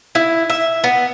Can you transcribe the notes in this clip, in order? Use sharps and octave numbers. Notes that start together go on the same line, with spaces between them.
E4
E5
B3